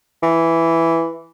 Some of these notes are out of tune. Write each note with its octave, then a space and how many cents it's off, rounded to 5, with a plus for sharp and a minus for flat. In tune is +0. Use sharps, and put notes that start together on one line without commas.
E3 +5